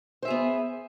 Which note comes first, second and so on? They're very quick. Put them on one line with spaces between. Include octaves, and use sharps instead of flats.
C5 E5 G#4 B3